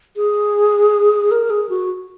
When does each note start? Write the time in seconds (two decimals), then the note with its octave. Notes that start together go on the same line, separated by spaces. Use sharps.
0.16 G#4
1.31 A#4
1.50 G#4
1.69 F#4